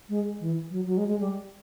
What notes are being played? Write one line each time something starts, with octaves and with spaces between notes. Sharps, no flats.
G#3
E3
F#3
F#3
G#3
G#3
G3